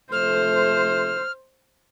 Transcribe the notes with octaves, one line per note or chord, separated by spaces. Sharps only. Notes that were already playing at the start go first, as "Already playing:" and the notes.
C3 F3 A3 C5 F6